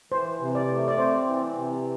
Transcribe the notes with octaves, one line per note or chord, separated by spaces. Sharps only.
E3 C5
C3
D5
A3
D5
C4 C5
E3
C3